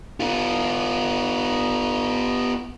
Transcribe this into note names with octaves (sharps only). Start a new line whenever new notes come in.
B3 F4